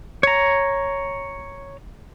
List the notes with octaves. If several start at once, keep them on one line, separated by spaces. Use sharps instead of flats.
C#5 A#5